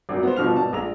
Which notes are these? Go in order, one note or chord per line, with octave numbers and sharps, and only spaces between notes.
G#1 F#2
B3 C5
G1 B2 F3 F6 F7
G#1 B2 A5
A#1 G#3 A#5 F7